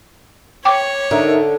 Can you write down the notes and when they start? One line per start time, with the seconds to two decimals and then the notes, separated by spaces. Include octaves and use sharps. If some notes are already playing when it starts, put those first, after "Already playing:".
0.65 C#5 G5 D6
1.11 D3 D#4 A#4 E5